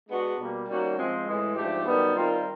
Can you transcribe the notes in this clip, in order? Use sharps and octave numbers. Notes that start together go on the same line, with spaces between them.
G#3 B3 D4 F#4
B2 G3 A#3
D#3 G3 A#3 C#4 F#4
F3 G#3 C4
A2 E3 G#3
G#2 F3 A3 D4 G4
F#2 D#3 G3 B3
D#3 G3 C4 F4 A#4